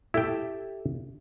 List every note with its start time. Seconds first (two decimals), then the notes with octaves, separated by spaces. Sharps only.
0.14 E4 G4 A4 E5 G5